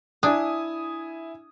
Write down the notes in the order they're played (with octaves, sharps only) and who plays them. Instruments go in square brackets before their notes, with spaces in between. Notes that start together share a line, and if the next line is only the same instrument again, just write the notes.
[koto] D4 [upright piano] E4 G#5 D#6